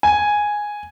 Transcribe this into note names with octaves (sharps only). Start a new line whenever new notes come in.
G#5